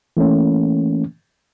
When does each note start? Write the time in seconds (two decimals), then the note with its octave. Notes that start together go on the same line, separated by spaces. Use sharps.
0.17 E3 A3 A#3 C#4